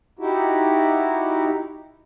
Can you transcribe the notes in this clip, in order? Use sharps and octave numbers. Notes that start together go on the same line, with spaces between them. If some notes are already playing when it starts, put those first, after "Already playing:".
D#4 E4 F#4 G4